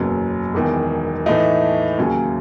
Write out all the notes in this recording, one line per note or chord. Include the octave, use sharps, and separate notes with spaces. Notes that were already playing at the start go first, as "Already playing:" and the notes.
Already playing: F#1 E2 B2 F#3 C#4
E1 E2 D#3
A2 E3 A3 D#4
D#2 C#3 F#3 C#4 G#4